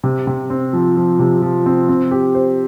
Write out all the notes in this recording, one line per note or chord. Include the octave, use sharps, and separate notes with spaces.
C3
C3
C4
F3
F3
C3
F3
C4
C4
G4
C5